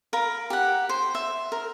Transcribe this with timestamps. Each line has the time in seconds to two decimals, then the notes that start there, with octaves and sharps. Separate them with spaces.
0.13 A#4 F5 B5
0.50 G4 F#5
0.89 C5
1.15 E5
1.52 A#4